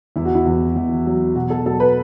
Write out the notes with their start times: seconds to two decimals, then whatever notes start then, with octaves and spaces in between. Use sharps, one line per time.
0.16 E2 E4
0.25 F#4
0.35 E4
0.46 E2
0.76 E2
1.06 F#3
1.35 B2 F#4
1.50 A4
1.66 F#3 A4
1.80 B4